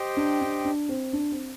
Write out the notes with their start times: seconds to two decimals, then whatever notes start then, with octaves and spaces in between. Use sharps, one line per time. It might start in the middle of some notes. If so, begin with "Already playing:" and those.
Already playing: G4 C5 D#5 G5
0.17 D4
0.41 D4
0.65 D4
0.89 C4
1.13 D4
1.32 C4